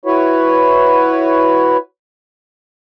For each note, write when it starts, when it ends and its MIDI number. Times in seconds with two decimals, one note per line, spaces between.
0.06 1.77 64
0.06 1.77 66
0.06 1.77 71
0.06 1.77 73